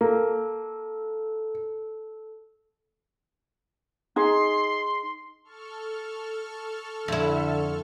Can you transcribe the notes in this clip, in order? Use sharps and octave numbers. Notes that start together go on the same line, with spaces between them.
A#3 A4
D#4 G#4 C6
A4 C#6 F6
F2 D3 E4 E5